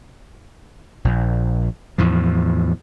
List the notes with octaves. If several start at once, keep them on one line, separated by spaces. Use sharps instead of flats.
A#1
E2 A2 F3